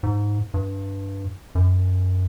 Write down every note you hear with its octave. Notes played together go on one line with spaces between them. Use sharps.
G#2
G2
F#2